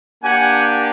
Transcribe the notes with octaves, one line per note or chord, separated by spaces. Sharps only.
A#3 D4 G4 F#5 G#5